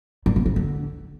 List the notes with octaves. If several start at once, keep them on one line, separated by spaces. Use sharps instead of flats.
G2
B2
D3
D3